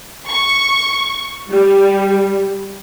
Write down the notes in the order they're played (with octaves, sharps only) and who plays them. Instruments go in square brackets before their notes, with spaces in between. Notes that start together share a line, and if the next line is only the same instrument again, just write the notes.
[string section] C#6
G3